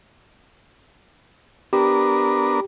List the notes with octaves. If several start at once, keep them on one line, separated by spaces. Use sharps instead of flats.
B3 D4 G4 A#4